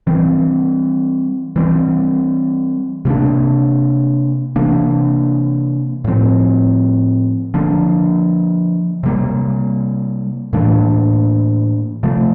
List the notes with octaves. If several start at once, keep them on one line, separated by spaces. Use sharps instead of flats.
E3 G3 C4
E3 G3 C4
C3 G3 A#3 D4
C3 E3 A#3 D4
A2 F3 C4
D3 F3 A#3 D4
C3 G3 A#3
A2 E3 A#3 D4
C3 F3 A3